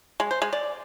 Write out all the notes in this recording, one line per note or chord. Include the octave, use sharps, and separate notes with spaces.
G#3
C5
G#3
D5